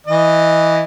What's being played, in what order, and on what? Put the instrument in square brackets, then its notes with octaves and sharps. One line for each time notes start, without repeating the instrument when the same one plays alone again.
[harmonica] E3 D#5